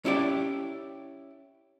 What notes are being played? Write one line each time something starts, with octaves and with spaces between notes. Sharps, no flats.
C#4 E4 G4 D5